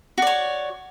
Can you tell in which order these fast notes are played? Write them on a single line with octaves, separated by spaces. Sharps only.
F#4 D5 C#5